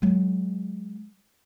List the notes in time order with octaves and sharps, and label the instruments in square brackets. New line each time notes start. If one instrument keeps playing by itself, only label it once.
[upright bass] F#3 G#3